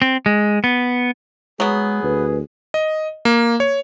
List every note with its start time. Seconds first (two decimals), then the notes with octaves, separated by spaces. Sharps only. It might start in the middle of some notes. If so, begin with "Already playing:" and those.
0.02 C4
0.26 G#3
0.64 B3
1.60 F#3 G#3 B3 G#4
2.03 D2 B4
2.74 D#5
3.25 A#3
3.60 C#5